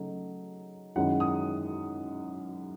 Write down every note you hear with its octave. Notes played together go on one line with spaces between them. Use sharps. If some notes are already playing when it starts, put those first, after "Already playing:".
Already playing: C#3 F#3 A3 D#4
F#2 D#3 G#3 C#4 E4 F#5
D#6